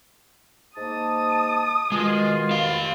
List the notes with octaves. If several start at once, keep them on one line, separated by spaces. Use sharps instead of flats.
G#2 A#3 A5 D#6
B2 D#3 G#3 F4
G4 F5